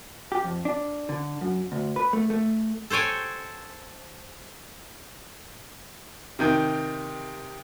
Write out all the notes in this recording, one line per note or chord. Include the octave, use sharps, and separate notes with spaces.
G4
F2
D4
D3
F#2
D2
B4
A3
A3
A4 C5 C#5 G5 G#5
C3 D#3 G5